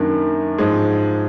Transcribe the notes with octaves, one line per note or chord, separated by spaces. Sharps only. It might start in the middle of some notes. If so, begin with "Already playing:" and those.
Already playing: F#2 D#3 A#3 D4
G#2 F3 G#3